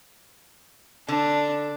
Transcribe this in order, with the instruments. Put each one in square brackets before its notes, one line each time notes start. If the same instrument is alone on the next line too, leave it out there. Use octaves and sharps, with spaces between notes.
[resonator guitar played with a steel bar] D3 [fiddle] D4